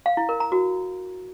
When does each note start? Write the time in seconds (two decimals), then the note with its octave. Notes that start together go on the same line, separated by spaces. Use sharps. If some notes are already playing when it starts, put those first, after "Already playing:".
0.06 F5
0.17 E4
0.29 A#4
0.40 A#5
0.52 F#4